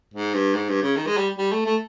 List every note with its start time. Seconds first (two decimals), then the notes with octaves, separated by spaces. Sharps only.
0.14 G#2
0.34 G2
0.55 G#2
0.69 G2
0.82 C#3
0.97 D#3
1.07 G#3
1.17 G3
1.38 G3
1.52 A3
1.66 A3